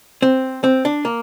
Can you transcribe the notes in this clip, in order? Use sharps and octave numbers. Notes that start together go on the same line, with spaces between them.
C4
C4
D4
A#3